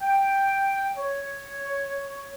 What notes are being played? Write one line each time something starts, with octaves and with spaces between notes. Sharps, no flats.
G5
C#5